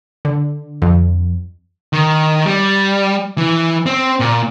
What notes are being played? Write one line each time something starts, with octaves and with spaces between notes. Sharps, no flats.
D3
F2
D#3
G3
E3
C4
A#2